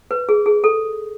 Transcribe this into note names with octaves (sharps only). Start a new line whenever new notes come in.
B4
G#4
G#4
A4